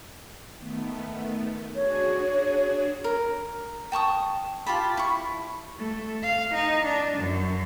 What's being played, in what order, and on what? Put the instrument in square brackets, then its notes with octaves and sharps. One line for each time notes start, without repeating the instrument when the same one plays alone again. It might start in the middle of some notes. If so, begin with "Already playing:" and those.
[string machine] D#3 A3 B3
[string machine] D4 F#4 G#4 [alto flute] C#5
[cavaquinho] A#4
G5 A5 C#6 D#6
F4 G4 A5 B5
E4 C#6
[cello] A3
F5
D#4
D4
F#2